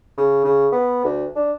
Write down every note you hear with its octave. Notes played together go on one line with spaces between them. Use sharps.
C#3
C#3
B3
D2
D4